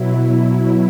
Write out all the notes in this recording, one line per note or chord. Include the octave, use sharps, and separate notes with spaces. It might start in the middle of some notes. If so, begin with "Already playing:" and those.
Already playing: B2 F#3 E4